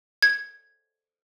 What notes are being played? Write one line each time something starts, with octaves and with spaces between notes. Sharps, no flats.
G#6